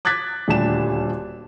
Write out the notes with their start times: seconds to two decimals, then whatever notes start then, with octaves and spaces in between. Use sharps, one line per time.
0.05 D6 F#6 G#6 A6 B6
0.48 D#1 D2 G3 D4 A5 E7